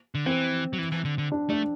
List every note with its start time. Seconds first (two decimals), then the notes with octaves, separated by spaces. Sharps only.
0.15 D3
0.26 E3 C4
0.73 F#3
0.78 E3
0.92 E3
1.05 D3
1.18 D3
1.32 D4
1.49 A3 D4